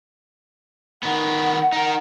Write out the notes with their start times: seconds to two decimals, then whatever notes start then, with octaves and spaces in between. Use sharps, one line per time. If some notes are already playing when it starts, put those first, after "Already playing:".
1.03 D#3 B3 F#5
1.72 D#4 A#4